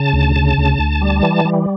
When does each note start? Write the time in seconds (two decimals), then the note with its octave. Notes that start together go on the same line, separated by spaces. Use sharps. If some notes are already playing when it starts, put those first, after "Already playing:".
Already playing: C#3 A5
0.13 D2
0.36 C#3
0.58 D2
0.79 D2
1.01 G3
1.23 E3
1.45 G3